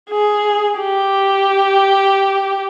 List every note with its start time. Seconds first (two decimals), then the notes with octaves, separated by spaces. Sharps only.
0.10 G#4
0.80 G4